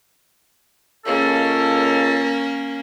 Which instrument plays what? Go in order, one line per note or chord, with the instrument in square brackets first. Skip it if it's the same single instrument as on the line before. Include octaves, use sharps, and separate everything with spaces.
[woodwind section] C#2 C#3 A4 [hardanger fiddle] A#3 C#4